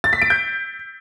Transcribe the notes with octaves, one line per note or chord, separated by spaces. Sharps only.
A6
B6
D7
G6